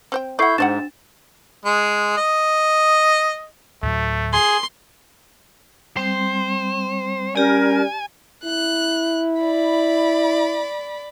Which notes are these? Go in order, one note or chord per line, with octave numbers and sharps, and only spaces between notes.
C4 C5 G5
E4 A4 D5 F#5 C#6 G6 C7
G#2 F#3 C4 D4 F#5 A6 E7
G#3
D#5
D2 A2 F#3 A3
G#4 C6
G3 C4 C5
G3 C#4 G4 A#4 D5 G#5
E4 F#6
D5 B5